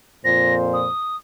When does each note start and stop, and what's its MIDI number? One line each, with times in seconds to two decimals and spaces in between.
0.25 0.87 41
0.25 0.87 46
0.25 0.87 72
0.25 0.54 94
0.73 1.17 87